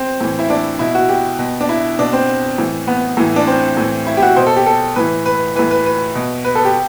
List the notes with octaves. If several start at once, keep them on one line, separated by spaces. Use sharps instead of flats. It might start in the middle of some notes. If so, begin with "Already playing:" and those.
Already playing: C4
A2 E3
E4
D4
B2 E4
F#4
G4
B2
D4
E4
B2 D4
C4
A2 E3
B3
A2 E3
D4
C4
A2 E3
E4
G4
F#4
B2 C5
A4
G4
A4
A2 E3 B4
B4
A2 E3 B4
B4
B4
B2
B4
A4
G4